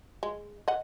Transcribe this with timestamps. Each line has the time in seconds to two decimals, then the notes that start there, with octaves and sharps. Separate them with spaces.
0.23 G#3
0.68 D#5 F#5